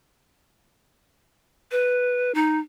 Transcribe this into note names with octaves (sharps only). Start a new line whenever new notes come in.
B4
D#4